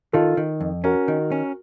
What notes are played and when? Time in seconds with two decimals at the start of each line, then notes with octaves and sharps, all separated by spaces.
0.13 D#3 F4 A4
0.37 D#3
0.61 F2
0.84 C#4 F#4 A#4
1.08 D#3
1.32 C#4